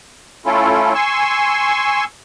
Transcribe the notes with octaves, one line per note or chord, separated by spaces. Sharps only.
A3 C#4 E4 F4 A4
G#5 C6 C#6 E6